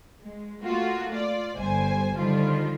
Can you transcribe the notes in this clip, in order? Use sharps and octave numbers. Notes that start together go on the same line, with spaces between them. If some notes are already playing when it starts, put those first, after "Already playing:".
G#3
A3 A#3 F4 F#4
F4 D5
G1 G3 C5 G#5
D3 D#3 F3 G3 F4